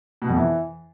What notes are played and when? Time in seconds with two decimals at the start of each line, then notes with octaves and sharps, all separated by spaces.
0.22 B2
0.29 F2
0.36 E3